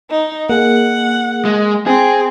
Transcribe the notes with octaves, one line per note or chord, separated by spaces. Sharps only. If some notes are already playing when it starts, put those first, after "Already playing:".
D#4
A#3 G#4 F#5
G#3
C4 G#4